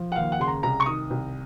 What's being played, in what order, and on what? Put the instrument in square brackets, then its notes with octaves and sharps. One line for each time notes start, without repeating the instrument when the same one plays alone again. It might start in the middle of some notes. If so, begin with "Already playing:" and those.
Already playing: [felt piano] F3
F#5
D#2 F5
F#5
C#3 C6
A#5
C2 A#5
C#6
D#3 D#6
C2